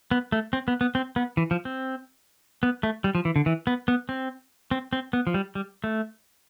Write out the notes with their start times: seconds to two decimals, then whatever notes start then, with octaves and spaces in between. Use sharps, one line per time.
0.11 B3
0.32 A3
0.53 C4
0.68 B3
0.81 B3
0.95 C4
1.16 B3
1.37 E3
1.51 F3
1.65 C4
2.63 B3
2.83 A3
3.04 G3
3.15 F3
3.25 E3
3.36 D3
3.46 E3
3.67 B3
3.88 B3
4.09 C4
4.71 C4
4.93 C4
5.13 B3
5.27 F3
5.34 G3
5.55 G3
5.84 A3